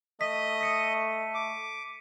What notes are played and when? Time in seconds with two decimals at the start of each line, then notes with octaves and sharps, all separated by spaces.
0.21 A3 D#5 D#6 B6
0.61 B6 C#7 D#7
1.35 D6